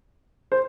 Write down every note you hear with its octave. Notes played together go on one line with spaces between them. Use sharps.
C5